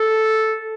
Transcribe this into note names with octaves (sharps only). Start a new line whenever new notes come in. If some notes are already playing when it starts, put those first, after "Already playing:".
Already playing: A4